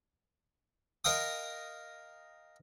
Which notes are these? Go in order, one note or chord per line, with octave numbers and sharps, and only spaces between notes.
A#4 D#5 F5 G5 D#6